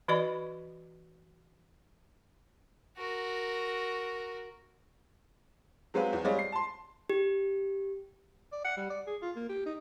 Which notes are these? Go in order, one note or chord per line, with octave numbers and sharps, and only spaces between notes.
E3 F#4 B4 D5 D#5 B5
F#4 A#4
F#3 G#3 C4 B4 F5
E2
G3 G#3 C4 C#5 D#5 F5
C7
A5 C6
G4
D5
F#5
G3
D5
G#4
F4
A#3
G4
D#4